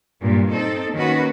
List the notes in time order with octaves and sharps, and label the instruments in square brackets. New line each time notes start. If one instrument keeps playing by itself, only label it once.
[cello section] G2 A#2 F#3
C4 D#4 A4
D#3 A#3 C#4 F#4 B4